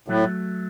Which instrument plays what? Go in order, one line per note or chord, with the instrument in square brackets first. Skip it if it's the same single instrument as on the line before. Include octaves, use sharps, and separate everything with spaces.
[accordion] A2 [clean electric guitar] F#3 A3